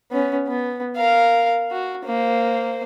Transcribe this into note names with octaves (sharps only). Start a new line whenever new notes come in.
B3 C#4
B3
A#4 F5
F#4
A#3 C5